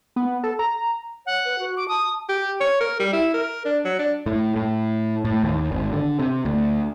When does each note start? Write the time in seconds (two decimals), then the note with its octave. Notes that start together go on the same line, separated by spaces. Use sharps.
0.16 B3
0.44 A4
0.59 A#5
1.26 C#5 F#5
1.44 B4
1.59 F#4
1.77 D6
1.88 A5 D#6
2.29 G4
2.61 C#5
2.81 A#4
3.00 G3
3.13 E4
3.34 A#4
3.65 D4
3.85 F#3
3.99 D4
4.26 A2
4.56 A2
5.25 A2
5.43 D#2
5.71 G#1
5.93 D3
6.19 C3
6.45 D2